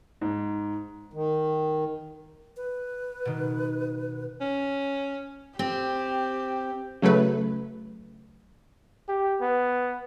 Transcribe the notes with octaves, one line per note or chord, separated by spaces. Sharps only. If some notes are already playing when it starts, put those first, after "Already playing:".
G#2
D#3
B4
B2 D#3
C#4
C4 G4
C#3 F#3 A3 B4
G4
B3